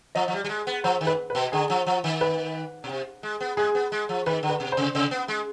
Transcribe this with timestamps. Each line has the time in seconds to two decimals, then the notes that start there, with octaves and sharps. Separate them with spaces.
0.15 F3 D#5
0.28 F3
0.33 G3
0.44 G3
0.49 G#3
0.67 B3
0.84 F3 C5
1.01 D#3
1.07 B4
1.30 B4
1.35 B2
1.52 D3 G#4
1.70 F3
1.86 F3
2.04 D#3
2.21 B4
2.84 B2
2.89 C3
3.23 G#3
3.41 B3
3.57 G#3 G#4
3.75 B3
3.92 G#3
4.09 F3
4.26 D#3 B4
4.43 D3
4.49 B4
4.60 B2
4.72 C3 C5
4.95 C3
5.11 B3
5.28 G#3